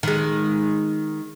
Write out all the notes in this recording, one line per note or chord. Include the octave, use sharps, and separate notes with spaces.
D#3 G#3